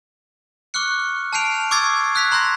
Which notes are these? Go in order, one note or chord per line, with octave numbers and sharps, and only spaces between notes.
C#6 D6 F6 F#6 C#7
A5 F6 G6 C7 D7 F7
C#6 D6 E6 G#6 A6 C7
E6 F#6 G#6 B6 C7 F7
A#5 C6 E6 G6 A#6